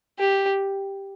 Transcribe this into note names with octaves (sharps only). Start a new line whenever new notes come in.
G4